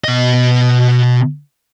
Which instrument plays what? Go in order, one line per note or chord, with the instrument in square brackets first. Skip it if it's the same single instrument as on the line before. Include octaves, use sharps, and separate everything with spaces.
[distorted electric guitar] B2 D#5